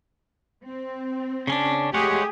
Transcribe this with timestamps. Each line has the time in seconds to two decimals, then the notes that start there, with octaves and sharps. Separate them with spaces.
0.65 C4
1.47 C#3 C#4 D4
1.94 G#3 A3 G4 G#4 C#5 F#5